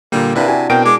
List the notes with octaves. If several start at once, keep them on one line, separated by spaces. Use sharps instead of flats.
A#2 D3 G3 A#3
C3 D4 E4 A#4 B4 F5
D4 E4 F#4 G#5
B2 C4 A#4 G5 D7
G#3 D6